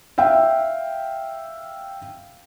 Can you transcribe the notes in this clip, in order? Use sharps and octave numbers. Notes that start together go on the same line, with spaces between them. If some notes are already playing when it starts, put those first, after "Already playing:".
E5 F5 G5